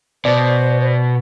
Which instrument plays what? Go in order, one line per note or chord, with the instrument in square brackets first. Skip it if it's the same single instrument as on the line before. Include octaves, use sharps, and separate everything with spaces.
[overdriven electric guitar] B2 [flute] C5 [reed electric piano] D5